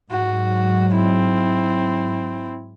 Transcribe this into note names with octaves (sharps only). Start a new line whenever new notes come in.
G#2 F#3 F#4
C4 E4